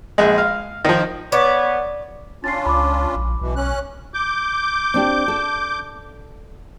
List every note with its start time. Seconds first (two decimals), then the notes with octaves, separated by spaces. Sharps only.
0.18 A#1 G#3
0.38 F5
0.85 D#3 F3
1.32 B3 B4 C#5 D5
2.44 C#4 D4 F4 A6 C7
2.66 C#2 B5 D6
3.16 A#1
3.41 B1 B2 E3
3.56 C#4 F#6
4.14 D6 G6
4.94 C4 D4 G4
5.28 A4